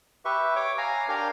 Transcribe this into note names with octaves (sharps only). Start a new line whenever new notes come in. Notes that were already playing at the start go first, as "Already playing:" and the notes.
G4 B4 E5 C#6
C#5 D6
F5 G#5 A#5
D4 G4 A#4 F5